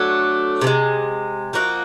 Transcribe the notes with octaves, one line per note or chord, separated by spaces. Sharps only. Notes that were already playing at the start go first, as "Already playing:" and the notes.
Already playing: F#3 A3 D4
C3 E3
G#3
F3 A#3 D#4 F#4